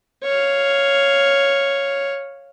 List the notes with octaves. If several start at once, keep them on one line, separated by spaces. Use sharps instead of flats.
C#5 F5